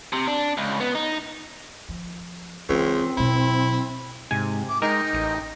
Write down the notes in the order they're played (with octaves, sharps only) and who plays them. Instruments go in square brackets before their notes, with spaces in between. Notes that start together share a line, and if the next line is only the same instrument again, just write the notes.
[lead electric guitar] C3
D4
C#2
B3
D#4
[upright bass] F3
[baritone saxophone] C#2 [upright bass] E3 [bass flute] C4
[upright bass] B2 F#3 [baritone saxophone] E4
[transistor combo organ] G#2 [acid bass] C3 [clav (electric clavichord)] G#5
[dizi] D6
[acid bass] G#3 [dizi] D#4 [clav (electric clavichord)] A#4 [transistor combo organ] D#5 G5
[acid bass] A1